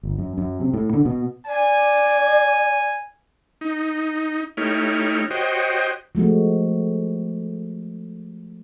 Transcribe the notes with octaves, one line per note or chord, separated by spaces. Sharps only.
G1
F#2
F#2
C3
A2
D3
B2
D5 G#5
D#4
A3 D#4 E4 G4 C#5 F6
F#4 G4 C5 C#5 D#5 G5
F3 G#3 A3 F#4